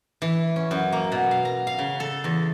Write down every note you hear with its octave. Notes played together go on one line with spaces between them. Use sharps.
E3
C#4
F#2
A#3
B2
F5
A#5
F5
C#3
A4
E2